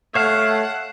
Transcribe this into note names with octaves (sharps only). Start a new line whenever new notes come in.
A3 C#5 F5 F#5 F6 C7 E7